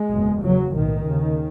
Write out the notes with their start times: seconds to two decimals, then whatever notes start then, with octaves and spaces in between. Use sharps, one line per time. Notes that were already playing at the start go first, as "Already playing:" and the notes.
Already playing: G#3
0.10 F#1 E2 B2
0.42 F#1 E2 C#3 F#3
0.74 B1 A2 D#3
1.06 D#2 C#3